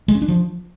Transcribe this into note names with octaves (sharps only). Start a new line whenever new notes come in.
G#3
C#4
D4
F3